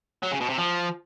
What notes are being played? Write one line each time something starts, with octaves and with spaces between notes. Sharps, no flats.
F#3
C#3
B2
C3
F3